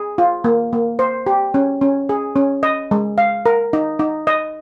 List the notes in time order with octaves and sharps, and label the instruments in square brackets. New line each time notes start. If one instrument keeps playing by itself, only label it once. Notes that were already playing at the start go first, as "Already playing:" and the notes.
Already playing: [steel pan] G#4
F4
A#3
A#3
C5
G4
C#4
C#4
G#4
C#4
D#5
G#3
F5
A#4
D#4
D#4
D#5